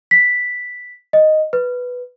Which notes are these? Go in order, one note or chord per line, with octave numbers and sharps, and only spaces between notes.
B6
D#5
B4